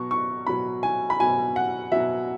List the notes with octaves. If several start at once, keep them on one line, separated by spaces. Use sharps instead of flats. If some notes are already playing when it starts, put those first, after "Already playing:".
Already playing: B2 F#3 C#6
C#6
B2 F#3 B5
G#5
B5
B2 F#3 G#5
F#5
B2 F#3 E5